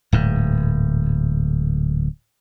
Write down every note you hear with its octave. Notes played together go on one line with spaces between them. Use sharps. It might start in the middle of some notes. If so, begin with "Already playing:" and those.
D1 G#2